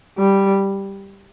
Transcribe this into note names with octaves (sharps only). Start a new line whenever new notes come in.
G3